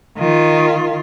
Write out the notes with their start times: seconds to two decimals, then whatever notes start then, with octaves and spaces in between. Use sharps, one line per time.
0.18 D#3 F4